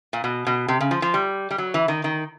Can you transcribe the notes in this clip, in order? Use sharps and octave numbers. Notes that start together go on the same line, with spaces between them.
A#2
B2
B2
C3
C#3
F3
F3
G3
G3
F#3
E3
D#3
D#3